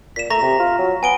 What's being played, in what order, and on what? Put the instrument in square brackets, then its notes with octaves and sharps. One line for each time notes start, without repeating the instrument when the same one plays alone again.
[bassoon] A#2 [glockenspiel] B6 E7
[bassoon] A3 [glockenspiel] A#5 C#6 A#6
[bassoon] C3
F4
F#3
[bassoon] B3 [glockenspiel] G#5 D7 G7